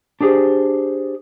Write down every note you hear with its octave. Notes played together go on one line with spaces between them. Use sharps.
D4 G4 G#4 C5